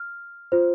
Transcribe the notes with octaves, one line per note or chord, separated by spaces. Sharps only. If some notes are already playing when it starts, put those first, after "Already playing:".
Already playing: F6
F4 C5